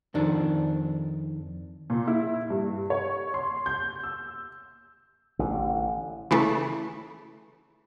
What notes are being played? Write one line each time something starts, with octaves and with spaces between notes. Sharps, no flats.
F2 D#3 D4
A#2
E4
G2
C#5
C6
G6
E6
A1 D3
C#3 E3 A3